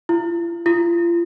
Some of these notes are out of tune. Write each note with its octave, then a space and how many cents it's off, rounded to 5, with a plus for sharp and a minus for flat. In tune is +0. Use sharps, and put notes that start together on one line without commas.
F4 -45
F4 -35